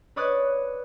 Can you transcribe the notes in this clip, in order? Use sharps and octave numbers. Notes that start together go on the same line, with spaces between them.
B4 C#5 D5 D#6 F#6